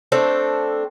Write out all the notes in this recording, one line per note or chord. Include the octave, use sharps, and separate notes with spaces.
A3 C4 D4 A4